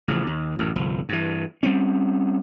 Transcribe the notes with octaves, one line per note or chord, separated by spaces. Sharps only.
A1 C#3 F3
D#2
A1 F#2
G1 C2 F3
G2 E3
G3 C4 C#4